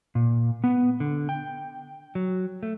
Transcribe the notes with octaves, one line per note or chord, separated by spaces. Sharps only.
A#2
B3
D3
G5
F#3
A3